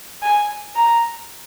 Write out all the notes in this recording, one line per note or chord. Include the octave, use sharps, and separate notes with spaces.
G#5
A#5